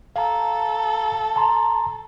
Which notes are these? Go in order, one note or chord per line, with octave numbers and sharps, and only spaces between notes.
A4 F5 A#5
A5 A#5 C6